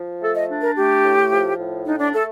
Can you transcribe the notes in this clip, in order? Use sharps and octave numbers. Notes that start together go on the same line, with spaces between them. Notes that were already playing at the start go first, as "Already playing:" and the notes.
Already playing: F3
A3 A4
D#5
D4
A#4
A3 G4
A2
F3
A2
D4 D#4
D4
A3 A4